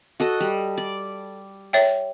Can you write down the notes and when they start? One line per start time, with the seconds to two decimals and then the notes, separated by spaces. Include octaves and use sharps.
0.20 F#4 A4 D#5
0.40 G3
0.78 D5
1.73 C#5 E5 G5